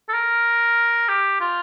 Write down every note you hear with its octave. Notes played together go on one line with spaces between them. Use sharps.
A4
A#4
G4
F4